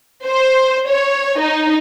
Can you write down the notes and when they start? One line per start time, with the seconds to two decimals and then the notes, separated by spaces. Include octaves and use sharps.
0.24 C5
0.87 C#5
1.40 D#4